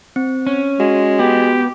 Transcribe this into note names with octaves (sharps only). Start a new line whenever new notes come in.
C4
C#4
G#3 F#4
B3 G4